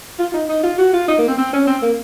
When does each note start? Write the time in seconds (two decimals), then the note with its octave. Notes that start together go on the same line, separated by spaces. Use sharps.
0.19 F4
0.34 D#4
0.49 D#4
0.63 F4
0.78 F#4
0.93 F4
1.08 D#4
1.18 A#3
1.28 C4
1.38 C4
1.53 C#4
1.67 C4
1.82 A#3